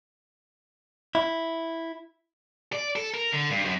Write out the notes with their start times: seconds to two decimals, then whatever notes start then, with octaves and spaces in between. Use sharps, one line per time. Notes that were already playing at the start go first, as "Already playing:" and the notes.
1.15 E4
2.73 D5
2.96 A4
3.14 A#4
3.33 D3
3.51 G2
3.65 F#2